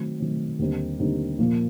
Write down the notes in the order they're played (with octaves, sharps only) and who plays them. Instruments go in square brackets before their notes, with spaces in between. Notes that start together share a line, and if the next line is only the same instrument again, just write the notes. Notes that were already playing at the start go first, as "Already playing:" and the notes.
Already playing: [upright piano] D#3 F#3 A3 C4
D#3 F#3 A3 C4
D#2 D3 G3 C4 D#4
D#2 D3 G3 C4 D#4
A#2 F3 A#3